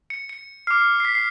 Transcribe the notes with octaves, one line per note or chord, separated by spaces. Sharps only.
C#7
C#7
D6 F6 C7
C7
B6
C7